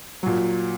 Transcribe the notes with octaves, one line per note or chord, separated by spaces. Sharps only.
A#2 F#3